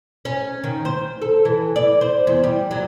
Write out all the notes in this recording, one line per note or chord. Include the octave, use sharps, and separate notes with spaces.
C#4
D#3
C5
A4
E3
D5
C5
E2
G3
F#3